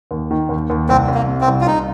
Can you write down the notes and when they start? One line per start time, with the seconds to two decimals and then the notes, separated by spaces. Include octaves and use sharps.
0.11 D#2
0.31 D#3
0.49 D#2
0.70 D#2
0.89 C2 C4
1.08 C2
1.14 A#3
1.28 C3
1.41 C4
1.47 C2
1.61 F4
1.67 C2 D#4